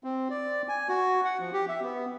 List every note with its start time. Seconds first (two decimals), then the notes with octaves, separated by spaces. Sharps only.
0.04 C4
0.30 D5
0.69 G#5
0.89 F#4
1.25 F#5
1.40 F3
1.53 G4
1.69 E5
1.82 B3